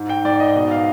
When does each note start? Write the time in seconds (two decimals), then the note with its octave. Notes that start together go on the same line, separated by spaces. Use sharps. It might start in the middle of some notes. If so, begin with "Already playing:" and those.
Already playing: G#2
0.09 G5
0.25 G#2 D5
0.40 D#5
0.56 B2
0.71 F5